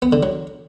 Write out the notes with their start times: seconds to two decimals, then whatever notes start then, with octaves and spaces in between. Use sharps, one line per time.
0.02 B3
0.13 D3
0.23 F#3